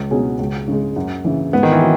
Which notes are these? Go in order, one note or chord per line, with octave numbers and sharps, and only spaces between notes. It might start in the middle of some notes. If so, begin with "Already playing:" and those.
Already playing: C#2
B2 F#3 C#4 G#4
C#2
C#3 G#3
F#2
C#3 E3
G#2 B3
D#3
E3
F#3